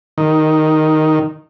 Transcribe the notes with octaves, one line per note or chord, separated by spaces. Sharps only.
D#3